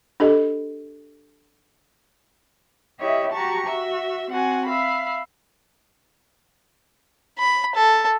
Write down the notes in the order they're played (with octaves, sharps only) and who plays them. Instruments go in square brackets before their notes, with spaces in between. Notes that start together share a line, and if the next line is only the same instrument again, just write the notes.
[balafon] D4 G4 A4 D#5
[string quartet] E4 G4 C#5 D#5 E5
F#4 G4 A5 A#5 C#6
F#4 E5
C4 F#4 F#5 G#5
E5 F5 B5
[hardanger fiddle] B5
A4